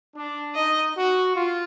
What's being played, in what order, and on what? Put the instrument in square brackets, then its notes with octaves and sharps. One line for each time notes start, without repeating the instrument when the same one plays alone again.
[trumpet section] D4
[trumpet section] D#4 [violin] D#5
[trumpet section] F#4
F4